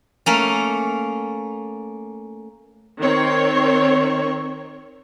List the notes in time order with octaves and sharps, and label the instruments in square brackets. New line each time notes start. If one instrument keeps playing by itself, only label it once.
[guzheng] A3 A#3 C#4
[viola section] D#3 C4 C#5